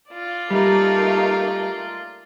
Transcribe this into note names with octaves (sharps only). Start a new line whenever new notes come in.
F4 D5
G3 A3 A#3 D#4